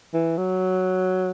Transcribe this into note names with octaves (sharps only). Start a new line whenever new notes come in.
E3
F#3